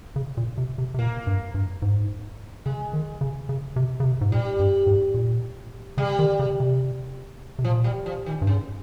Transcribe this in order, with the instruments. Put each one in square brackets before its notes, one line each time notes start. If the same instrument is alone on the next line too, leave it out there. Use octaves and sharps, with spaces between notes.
[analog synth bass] C#3
A#2
C3
C3
C3
[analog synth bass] A#2 [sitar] A#3
[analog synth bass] G2
G2
G#2
[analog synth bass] C#3 [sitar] G#3
[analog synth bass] D#3
C#3
C#3
C3
C#3
C3
G#2
[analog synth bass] A#2 [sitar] G3
[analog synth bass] G2
G#2
A#2
[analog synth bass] C#3 [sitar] G3
[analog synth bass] D#3
C#3
C3
C3
[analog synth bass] A#2 [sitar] F3
[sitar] G3
F3
D#3
[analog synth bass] G2
[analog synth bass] G#2 [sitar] C#3